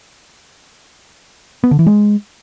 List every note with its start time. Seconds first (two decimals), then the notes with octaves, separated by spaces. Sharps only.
1.64 B3
1.71 D3
1.79 E3
1.87 G#3